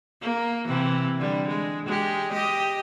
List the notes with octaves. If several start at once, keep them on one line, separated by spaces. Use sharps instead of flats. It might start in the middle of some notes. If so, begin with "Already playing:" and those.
A#3
C3 E3
D3 G3
G#3
G#3 G4
G4 D#5